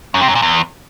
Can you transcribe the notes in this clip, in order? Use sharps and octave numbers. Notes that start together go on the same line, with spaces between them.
F#2
C3
F#2
A#2
E2